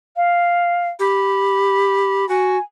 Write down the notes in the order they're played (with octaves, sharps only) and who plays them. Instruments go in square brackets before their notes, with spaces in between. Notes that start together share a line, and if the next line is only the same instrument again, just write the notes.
[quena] F5
[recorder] G4 [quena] B5
[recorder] F#4 [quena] G#5